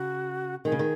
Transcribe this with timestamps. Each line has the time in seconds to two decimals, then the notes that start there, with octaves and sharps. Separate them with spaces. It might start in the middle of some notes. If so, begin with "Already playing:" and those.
Already playing: C#3 F#4
0.65 D#3 G#4
0.72 C#3
0.79 D#3